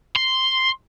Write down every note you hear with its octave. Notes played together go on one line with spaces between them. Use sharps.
C6